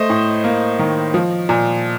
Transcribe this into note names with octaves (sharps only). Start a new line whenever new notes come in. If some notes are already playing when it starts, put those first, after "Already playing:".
Already playing: A3 C5 D#5
A2
A#3
D#3
F3
A#2